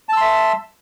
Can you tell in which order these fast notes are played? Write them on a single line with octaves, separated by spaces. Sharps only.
A5 E6 C6 E5